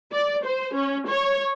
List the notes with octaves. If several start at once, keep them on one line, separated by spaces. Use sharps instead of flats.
D5
C5
C#4
C#5